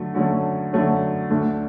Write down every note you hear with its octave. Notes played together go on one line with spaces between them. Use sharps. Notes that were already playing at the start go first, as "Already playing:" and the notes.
Already playing: D3 F#3 A3
D3 F#3 A3 C#4
D3 F#3 A3 C#4
D2 D3 A3 D4